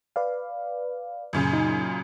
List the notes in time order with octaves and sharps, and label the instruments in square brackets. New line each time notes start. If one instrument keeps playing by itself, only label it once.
[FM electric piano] B4 D5 F5
[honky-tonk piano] F#2 A#2 C#3
[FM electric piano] D#4